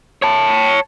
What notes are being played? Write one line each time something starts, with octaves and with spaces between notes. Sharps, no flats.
C#5 A5